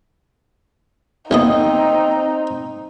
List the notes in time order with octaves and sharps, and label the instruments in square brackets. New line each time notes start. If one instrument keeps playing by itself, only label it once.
[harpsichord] D#2 B3 D#5 [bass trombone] C4 [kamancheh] D#4